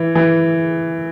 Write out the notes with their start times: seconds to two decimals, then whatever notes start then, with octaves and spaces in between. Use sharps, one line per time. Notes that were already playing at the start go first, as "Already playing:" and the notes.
Already playing: E3
0.15 E3